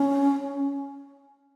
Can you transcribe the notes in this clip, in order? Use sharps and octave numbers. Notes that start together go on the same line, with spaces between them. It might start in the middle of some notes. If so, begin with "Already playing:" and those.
Already playing: C#4